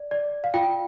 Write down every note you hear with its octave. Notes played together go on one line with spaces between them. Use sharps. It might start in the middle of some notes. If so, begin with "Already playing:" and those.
Already playing: D5
D5
F5
F4 G5